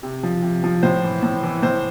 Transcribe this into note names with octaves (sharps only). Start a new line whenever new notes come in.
C3
F3
C3
F3
A2 C5
E3
A2
E3
A2 C5